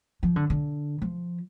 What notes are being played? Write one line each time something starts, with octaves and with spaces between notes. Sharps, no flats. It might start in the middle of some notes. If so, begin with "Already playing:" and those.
F3
D3
D3
F3